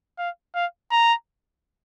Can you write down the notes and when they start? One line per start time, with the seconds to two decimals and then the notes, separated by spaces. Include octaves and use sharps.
0.18 F5
0.55 F5
0.91 A#5